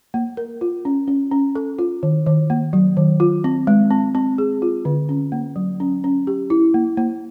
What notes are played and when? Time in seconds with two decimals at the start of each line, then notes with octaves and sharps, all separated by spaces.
0.14 A#3
0.37 A#4
0.61 F4
0.85 C#4
1.08 C#4
1.32 C#4
1.55 A4
1.79 F4
2.03 D#3
2.26 D#3
2.50 A#3
2.73 F#3
2.97 D#3
3.20 F4
3.44 C4
3.67 G#3
3.91 C4
4.15 C4
4.38 G#4
4.62 F4
4.85 D3
5.09 C#4
5.32 A#3
5.56 F#3
5.80 C#4
6.04 C#4
6.27 G4
6.50 E4
6.74 A#3
6.97 A#3